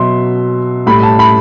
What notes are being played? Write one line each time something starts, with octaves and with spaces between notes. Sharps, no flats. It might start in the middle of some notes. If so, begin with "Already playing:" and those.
Already playing: B2 F#3 E5 C6
A2 G3 B5
A5
B5